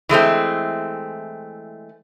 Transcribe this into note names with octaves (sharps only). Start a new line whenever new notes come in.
E3 G#3 A3 C4